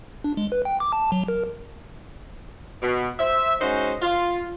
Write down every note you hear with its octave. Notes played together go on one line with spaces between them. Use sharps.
D4
G#3
B4
G5
D6
A5
F#3
A#4
B2
C5 E5
G#3 C#4 D#4 F#4 C5
F4